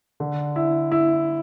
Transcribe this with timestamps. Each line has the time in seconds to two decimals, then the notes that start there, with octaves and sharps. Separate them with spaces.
0.20 D3
0.56 E4
0.92 E4